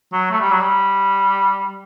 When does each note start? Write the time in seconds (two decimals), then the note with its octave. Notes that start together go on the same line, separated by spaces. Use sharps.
0.12 F#3
0.31 A3
0.40 G3
0.51 F#3
0.60 G3